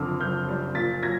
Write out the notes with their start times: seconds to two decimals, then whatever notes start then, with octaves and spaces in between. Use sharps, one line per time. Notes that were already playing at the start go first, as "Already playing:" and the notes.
Already playing: F#1 F2 D3 D6 E6 F6
0.20 F#1 F6 G6
0.48 G3
0.75 A#2 A6 B6
1.03 F#3 G#6 A#6